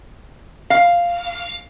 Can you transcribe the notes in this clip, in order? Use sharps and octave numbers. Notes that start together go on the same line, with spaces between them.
F5